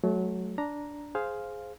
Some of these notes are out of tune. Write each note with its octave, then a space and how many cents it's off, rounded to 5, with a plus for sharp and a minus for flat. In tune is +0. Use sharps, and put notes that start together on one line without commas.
F#3 +0 A3 -30
D4 -5 A#5 +0
G#4 +10 C5 +0 F5 +0